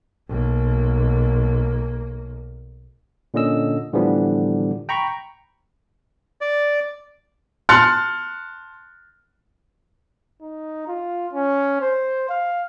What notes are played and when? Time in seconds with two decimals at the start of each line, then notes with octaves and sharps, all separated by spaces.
0.29 B1 A#3
3.34 A#2 D3 C#4 D#5 E6
3.93 A2 D3 E3 F3 G3 B3
4.89 G5 A#5 B5 C#6
6.41 D5
7.69 A5 C6 F6 F#6 A6 C#7
10.42 D#4
10.88 F4
11.33 C#4
11.81 C5
12.29 F5